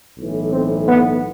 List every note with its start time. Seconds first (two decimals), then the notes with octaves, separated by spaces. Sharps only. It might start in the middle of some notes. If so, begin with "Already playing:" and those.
0.18 B1 A2 E3
0.52 C4
0.87 B3